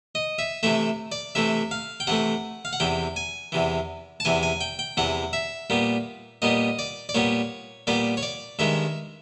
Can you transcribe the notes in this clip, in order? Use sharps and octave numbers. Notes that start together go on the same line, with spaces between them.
D#5
E5
C3 E3 A3 E5
D5
C3 E3 A3 E5
F5
G5
C3 E3 A3 F#5
F5
F#5
E2 C3 E3 G5
G#5
E2 C3 E3
A5
E2 C3 E3 G#5
G#5
G5
G5
E2 C3 E3 F#5
E5
A#2 G3 B3
A#2 G3 B3 D#5
D5
D5
A#2 G3 B3 C#5
A#2 G3 B3 D5
C#5
D5
G2 D#3 G#3 E5